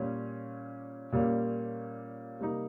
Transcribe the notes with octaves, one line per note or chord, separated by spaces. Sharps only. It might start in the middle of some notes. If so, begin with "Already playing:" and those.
Already playing: A#2 G3 C#4
A#2 G3 A#3 C#4
C3 G3 A#3 D#4